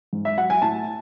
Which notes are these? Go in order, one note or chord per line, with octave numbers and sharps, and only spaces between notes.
G#2
E5
F#3 F#5
G#5
A2 A5